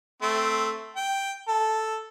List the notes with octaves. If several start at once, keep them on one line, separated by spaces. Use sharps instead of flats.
A3 C4
G5
A4